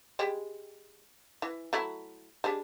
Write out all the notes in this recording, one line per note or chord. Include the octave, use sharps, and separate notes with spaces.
G3 G#3 G5
E3
F#3 A3 E4
G3 G#3 D4